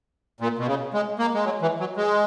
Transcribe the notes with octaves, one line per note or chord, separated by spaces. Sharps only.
A#2
B2
C#3
G#3
A#3
G#3
F#3
E3
F#3
G#3